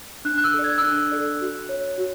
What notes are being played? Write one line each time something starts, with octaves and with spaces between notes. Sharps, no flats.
D4 F#6
F#6
E6
A4 D5
G#6
E6
D4 F#6
A4 D5
F#4
C#5
F#4